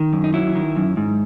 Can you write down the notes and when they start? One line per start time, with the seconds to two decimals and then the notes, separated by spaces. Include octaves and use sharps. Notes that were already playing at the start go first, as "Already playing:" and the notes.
Already playing: D#3
0.13 F#2
0.24 D#4
0.34 F#3 E4
0.56 D#3
0.77 F#2
0.97 G#2